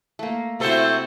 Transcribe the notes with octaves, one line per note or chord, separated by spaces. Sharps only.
A3 A#3
C3 A3 E4 F#4 A4 C5